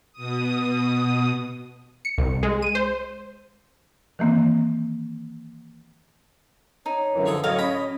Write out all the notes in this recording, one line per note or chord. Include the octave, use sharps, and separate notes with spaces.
B2 D#6
C#7
C2
G#3
D#7
C5
D#3 E3 A#3 C4
D#4 C#5
F#2 D3 E3
F3 G#4 A4
A2 F#3 C#5 D#5 F5
C#4 G5 B5 D#6